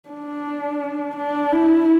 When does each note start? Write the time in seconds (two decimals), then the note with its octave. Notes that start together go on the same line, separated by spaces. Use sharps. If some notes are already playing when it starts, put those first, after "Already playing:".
0.10 D4
1.16 D4
1.53 E4